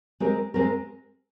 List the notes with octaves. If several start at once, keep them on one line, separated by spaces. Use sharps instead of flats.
G#3 C4 G4 A#4
G#3 C4 G4 A#4